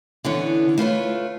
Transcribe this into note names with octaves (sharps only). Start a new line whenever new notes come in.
D3 E3 B3 C#4
A3 F4 B4 C#5